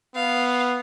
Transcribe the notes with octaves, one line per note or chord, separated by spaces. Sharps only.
B3 F5